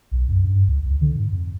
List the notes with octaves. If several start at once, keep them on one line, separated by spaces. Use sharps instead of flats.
B1
F#2
G2
C#2
C#2
D3
G#2
F2